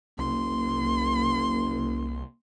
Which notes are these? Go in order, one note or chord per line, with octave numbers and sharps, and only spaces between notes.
F#1 C2 A#3 C6